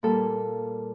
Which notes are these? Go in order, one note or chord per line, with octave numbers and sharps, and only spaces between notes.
A#2 G3 A#3 A4